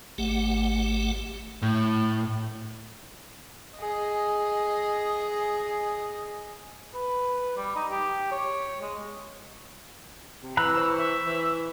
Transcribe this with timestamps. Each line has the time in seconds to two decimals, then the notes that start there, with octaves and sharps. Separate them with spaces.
0.18 G#1 A3 G4 F#5
1.62 A2
3.78 G#4 D#5
6.94 B4
7.57 G3
7.76 D#4
7.90 G4
8.32 C#5
8.81 G#3
10.42 C3
10.57 E3 A#5 B5 E6 F#6
10.77 C5 C#6
10.97 E5
11.26 E3